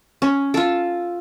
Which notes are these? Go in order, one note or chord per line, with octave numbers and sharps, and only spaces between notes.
C#4
F4 A4